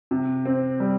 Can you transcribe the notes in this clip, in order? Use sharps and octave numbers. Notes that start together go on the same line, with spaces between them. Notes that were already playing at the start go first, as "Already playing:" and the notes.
C3
C4
G3